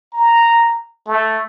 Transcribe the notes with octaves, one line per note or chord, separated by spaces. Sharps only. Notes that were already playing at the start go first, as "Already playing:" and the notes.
A#5
A3